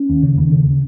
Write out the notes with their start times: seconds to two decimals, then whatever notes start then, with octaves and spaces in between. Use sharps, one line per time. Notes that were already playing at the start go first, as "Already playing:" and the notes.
Already playing: C#4
0.09 D#2
0.23 C#3
0.38 D#2
0.52 C#3